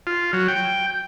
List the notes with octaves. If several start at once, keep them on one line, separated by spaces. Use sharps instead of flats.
F4
F#3
G5